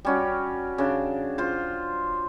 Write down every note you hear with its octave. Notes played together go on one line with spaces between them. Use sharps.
G3 C#4 F#4
C#3 D4
F4 C5